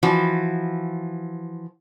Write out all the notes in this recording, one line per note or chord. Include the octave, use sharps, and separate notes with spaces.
E3 F3 F#4